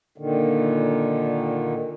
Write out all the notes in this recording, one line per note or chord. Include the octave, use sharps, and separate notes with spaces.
A#2 D3 D#3